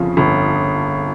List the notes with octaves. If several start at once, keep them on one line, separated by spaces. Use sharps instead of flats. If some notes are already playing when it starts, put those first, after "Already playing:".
Already playing: G1 F2 C#3 F3
G1